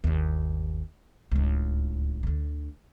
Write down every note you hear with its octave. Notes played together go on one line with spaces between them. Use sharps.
G1 D#2
D1 C#2
D2 D3